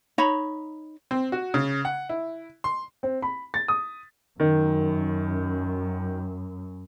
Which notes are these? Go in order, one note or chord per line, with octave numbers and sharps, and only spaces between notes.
D#4 C#5 A#5 B5
C4
F#4
C#3
F#5
E4
C6
C4
B5
A6
D#6
F#2 D#3